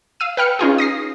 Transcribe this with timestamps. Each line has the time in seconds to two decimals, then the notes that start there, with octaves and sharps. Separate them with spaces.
0.20 F5 E6 D#7
0.37 B4 G5 F6 C#7
0.59 C#4 D#4 F4 G#4
0.78 D#6 A#6 C7